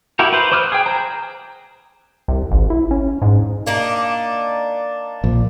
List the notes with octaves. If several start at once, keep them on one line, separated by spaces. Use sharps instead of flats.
E4 F#4 G4 A#4
B4 C5
C5 D6 D#6 F6 F#6
G#4 G5
C5 A#5
C2
G#1
E4
C#4
G#2
A#3 D4 D#4
A#1